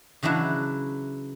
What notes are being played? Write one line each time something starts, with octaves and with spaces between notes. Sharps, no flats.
C#3 E3 F#3 D4 E4